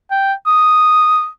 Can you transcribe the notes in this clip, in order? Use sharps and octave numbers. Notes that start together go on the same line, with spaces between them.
G5
D#6